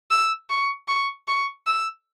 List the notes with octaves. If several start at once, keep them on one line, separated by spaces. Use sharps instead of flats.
E6
C#6
C#6
C#6
E6